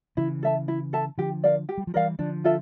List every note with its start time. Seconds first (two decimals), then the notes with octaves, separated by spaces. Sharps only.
0.17 C#3 E3 E4
0.43 A4 E5 A5
0.68 E4
0.93 A4 E5 A5
1.18 D3 F3 G4
1.44 A#4 D5 F5
1.69 G4
1.78 G3
1.87 F3
1.94 E3 G3 A#4 D5 F5
2.19 D3 F3 D4
2.44 F4 A4 E5